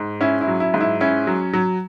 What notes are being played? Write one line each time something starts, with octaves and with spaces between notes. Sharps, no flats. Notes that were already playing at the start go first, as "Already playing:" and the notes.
Already playing: G#2
C#4 E4
E4
F#3
E4
G#2
E4
C#4 E4
F#3
F#3